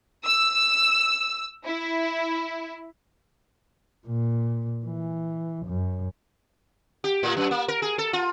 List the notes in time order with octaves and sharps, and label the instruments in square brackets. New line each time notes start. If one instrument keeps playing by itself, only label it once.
[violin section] E6
E4
[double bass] A#2
E3
F#2
[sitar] G4
A2
F#2
A#3
A#4
G#4
A4
F4